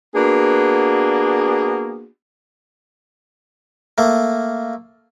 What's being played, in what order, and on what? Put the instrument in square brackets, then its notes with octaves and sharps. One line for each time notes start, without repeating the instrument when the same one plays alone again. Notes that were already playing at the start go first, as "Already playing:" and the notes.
[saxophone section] A#3 B3 D4 F#4 G#4
[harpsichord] A3 A#3